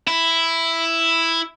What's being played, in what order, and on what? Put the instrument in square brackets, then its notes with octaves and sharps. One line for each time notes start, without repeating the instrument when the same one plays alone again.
[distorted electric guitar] E4